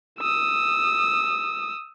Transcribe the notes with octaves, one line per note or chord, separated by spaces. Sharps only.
D#6 E6